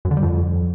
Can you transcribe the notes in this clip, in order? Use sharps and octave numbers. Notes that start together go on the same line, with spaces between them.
F#2
D3
G3
F2